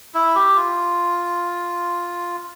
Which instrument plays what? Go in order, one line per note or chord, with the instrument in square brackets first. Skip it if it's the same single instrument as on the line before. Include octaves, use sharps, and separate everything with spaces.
[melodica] E4
G4
F4